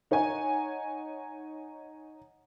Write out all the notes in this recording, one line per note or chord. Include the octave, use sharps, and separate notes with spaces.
D#4 C#5 F#5 G#5